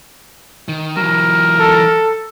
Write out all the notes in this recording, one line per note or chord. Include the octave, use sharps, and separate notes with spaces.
D#3
E3 F#3 A#4
A4